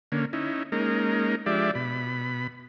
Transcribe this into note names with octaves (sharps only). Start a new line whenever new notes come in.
D3 A#3 C#4
C#4 D#4 E4
G#3 A#3 C#4 D#4 A#4
F3 G#3 D4 G4 D5 E5
B2 B5